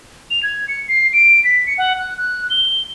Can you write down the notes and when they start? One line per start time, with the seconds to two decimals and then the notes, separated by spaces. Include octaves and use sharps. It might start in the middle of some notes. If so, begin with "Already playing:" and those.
0.31 F7
0.43 G#6
0.68 C#7
0.88 C7
1.13 D7
1.44 B6
1.67 C#7
1.78 F#5
1.99 F#6
2.17 F#6
2.50 G7